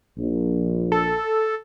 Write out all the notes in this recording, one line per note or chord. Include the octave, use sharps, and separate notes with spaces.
A#1
A4